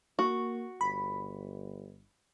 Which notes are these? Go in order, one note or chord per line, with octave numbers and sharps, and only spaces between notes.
A#3 F#4 C#6
G1 B5